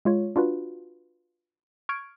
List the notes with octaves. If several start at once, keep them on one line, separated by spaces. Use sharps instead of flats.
G#3 F4 C#5
D4 F4 F#4 B4
C#6 F6 G#6 D7